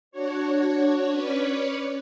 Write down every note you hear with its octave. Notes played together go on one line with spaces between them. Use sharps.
D4 F#4 C#5
C#4 B4 C#5 D5